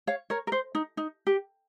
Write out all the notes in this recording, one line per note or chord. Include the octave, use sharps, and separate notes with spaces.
C#5 F5
A#4 C#5
A#4
C5
D#4
D#4
G4